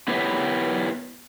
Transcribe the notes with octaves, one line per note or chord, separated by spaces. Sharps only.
B3 E4 G4 B4 C#5 E5